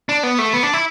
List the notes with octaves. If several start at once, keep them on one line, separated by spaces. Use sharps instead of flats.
D4
B3
A3
B3
D4
E4